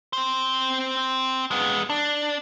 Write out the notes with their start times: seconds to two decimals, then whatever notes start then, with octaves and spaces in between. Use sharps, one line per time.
0.13 C4 C5
1.51 G#3 B3
1.90 D4